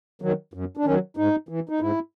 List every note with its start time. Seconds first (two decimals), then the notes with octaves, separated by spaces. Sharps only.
0.22 D#3 F#3
0.54 F#2
0.77 D4
0.85 D#3 F#3 C#4
1.17 G#2 D#4
1.49 E3
1.69 D#4
1.80 G#2 E4